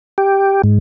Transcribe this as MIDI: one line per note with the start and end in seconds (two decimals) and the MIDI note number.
0.18 0.62 67
0.64 0.79 44